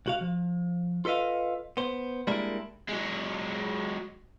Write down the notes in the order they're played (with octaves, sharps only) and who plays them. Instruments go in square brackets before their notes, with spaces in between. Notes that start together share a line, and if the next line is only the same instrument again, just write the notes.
[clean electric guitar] C#2 F#4 F5
F3
F4 A4 B4 D#5 F5
B3 C5
G3 G#3 A#3 D4 E4 A#4
[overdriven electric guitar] F#3 G#3